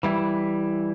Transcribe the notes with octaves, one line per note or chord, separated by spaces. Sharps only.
E3 G3 E4